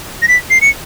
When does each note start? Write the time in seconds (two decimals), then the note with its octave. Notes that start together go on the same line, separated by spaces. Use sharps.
0.22 A#6
0.28 B6
0.50 C7
0.62 C#7